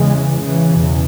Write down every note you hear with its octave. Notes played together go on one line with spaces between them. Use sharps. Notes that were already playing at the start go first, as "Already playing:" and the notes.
Already playing: E2 C#3 E3 G#3
C#3 E3
E2 B2